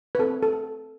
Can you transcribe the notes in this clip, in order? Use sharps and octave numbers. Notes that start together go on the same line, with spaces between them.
B4
C4 A4
A4